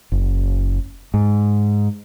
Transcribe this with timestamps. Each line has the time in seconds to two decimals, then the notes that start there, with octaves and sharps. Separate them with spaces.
0.12 F#1
1.14 G#2